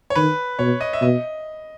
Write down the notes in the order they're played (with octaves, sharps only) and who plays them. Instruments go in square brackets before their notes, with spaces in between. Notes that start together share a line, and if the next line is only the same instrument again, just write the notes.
[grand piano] C#5
[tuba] D#3 [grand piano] B4
[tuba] B2 [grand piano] C#5
[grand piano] D#5
E5
[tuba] B2 [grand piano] D#5